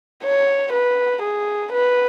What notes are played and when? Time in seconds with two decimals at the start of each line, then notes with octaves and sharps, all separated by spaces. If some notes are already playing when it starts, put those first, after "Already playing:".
0.24 C#5
0.74 B4
1.23 G#4
1.73 B4